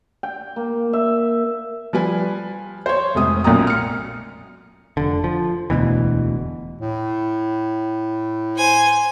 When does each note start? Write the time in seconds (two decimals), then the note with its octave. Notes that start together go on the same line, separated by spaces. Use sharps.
0.23 G5
0.56 A#3
0.93 E5
1.93 F3 G3 B4 G#5
2.86 C5 C#5
3.15 F1 G#2 C3 D#6
3.44 B1 F#2 A#2 A#5 D#6
3.67 F6 C#7
4.97 F1 D3
5.24 F3
5.70 E1 D2 B2 E3
6.81 A2
8.56 C5 G#5